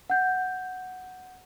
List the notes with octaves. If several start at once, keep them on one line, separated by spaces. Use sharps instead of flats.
F#5 G6